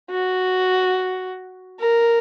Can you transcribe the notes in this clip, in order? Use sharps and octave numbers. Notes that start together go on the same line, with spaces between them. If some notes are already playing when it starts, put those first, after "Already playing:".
F#4
A#4